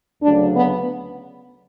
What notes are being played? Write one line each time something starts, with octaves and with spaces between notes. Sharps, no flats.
D2 C#3 F#3 D4
B3